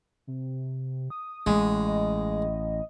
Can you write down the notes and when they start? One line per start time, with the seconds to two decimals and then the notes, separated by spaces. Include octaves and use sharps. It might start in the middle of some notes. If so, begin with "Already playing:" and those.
0.27 C3
1.10 D#6
1.47 A1 G#3
1.86 D#5